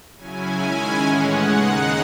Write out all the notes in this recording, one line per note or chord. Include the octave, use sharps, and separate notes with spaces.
C#3 F#3 C#4 E4 G#5
D#3 G#3 C#4 E4
A2 E3 G#3 C#4 F#5
D#2 C#3 G#3 D#4